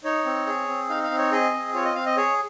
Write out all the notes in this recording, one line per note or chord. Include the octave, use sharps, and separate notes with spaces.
D#4 C#5
C4
G#4
C4
D#4 F5
F5
C4
C#5
G#4 D#5
C4
F4 C#5
D#5
C4 F5
D#5
G#4 C#5